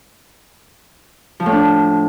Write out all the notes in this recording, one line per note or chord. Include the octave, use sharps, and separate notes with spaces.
F3
A2
D4